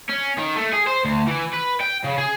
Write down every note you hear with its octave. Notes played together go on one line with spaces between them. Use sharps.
C#4
D#3
A3
G#4
C5
D2
E3
B4
G5
C#3
G#4